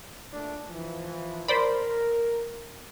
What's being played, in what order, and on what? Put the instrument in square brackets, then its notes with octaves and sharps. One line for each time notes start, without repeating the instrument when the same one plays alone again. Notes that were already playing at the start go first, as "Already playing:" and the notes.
[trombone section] A#2 A3 D4
E3 F3
[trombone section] A#4 [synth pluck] C5 D5 B5